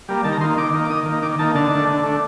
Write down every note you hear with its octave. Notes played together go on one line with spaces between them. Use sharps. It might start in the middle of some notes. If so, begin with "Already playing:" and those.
G3 A#3
D#3 A5
A#5
A#3 D#4 C6
D#3 D6
A#3 D#4
D6
D#3 D#6
A#3 D#4
D#3 D6
A#3 D#4 A5
D3 A5
A3 D4
D3
A3 D4